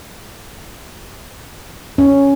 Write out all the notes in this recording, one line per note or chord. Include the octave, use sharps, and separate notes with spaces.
C#4